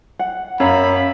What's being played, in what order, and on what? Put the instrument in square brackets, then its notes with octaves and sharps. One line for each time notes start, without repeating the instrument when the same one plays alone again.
[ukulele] F#5
[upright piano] F#2 [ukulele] C#5 F5 [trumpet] B5